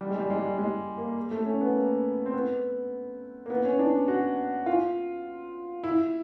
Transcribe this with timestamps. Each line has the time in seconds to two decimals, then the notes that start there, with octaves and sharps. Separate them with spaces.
0.01 G3
0.10 G#3
0.20 G3
0.30 G#3
0.39 G3
0.58 G#3
0.98 A#3
1.31 A3
1.46 C#4
1.61 B3
1.75 A#3
2.26 C4
2.34 B3
3.46 A#3
3.50 B3
3.65 C#4
3.79 D4
4.08 F#4
4.66 F4
5.84 E4